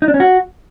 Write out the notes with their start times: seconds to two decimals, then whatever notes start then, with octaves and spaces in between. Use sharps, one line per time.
0.02 D#4
0.08 D4
0.14 C#4
0.20 F#4